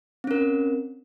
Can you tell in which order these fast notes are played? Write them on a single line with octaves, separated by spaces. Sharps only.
C4 C#4 A#4